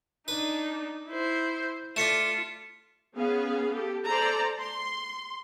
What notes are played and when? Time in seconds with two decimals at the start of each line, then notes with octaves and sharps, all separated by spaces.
0.28 D4 D#4 B4
1.08 E4 C5
1.96 A3 D4 F4 B6 C#7 E7
3.16 B3 C#4 G#4 F5
3.73 G4 A4
4.07 A4 C5 D5 A#5
4.59 C6